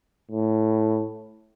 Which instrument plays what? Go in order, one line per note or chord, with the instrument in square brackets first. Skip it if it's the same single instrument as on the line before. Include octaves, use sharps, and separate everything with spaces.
[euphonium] A2